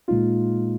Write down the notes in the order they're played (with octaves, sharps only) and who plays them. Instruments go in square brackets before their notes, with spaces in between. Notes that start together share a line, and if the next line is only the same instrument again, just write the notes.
[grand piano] A#2 G#3 D#4 [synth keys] F4